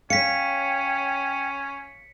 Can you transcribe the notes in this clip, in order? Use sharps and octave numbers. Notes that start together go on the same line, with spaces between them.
C#4 C#5 F5 G5 B6 C#7